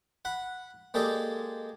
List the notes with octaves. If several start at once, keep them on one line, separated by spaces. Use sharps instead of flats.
F#5 B5
G#3 A#3 G4 A4 D5 D#5